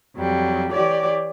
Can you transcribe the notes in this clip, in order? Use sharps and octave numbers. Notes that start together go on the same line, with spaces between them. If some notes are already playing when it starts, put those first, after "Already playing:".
F2 F#3 G3
E3 G4 C#5 D5